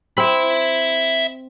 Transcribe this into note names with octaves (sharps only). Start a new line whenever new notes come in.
C4 E5 B5